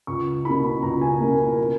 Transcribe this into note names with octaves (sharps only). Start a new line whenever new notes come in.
C#2 C#6
B2 A#3 E4 B5
B5
C#2 A#5
G#5
B2 A#3 E4 A#4
A#4
A#4